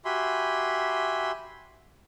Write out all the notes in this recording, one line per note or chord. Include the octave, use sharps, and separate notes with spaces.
F#4 G4 E5 G#5 B5 C6